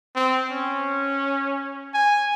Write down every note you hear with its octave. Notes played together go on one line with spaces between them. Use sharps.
C4
C#4
G#5